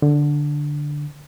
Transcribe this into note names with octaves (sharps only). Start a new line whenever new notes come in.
D3